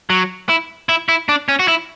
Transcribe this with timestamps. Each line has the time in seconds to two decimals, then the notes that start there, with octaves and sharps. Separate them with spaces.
0.10 F#3
0.49 E4
0.89 E4
1.09 E4
1.29 D4
1.49 C#4
1.60 F#4
1.68 E4